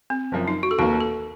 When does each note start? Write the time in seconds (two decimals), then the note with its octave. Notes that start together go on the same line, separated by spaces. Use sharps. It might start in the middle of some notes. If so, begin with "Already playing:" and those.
0.10 C4
0.32 F#1 F#2 F3
0.48 D#4
0.63 F#4
0.71 A4
0.78 F1 D#2 D#3 A#3 F#4
1.00 A4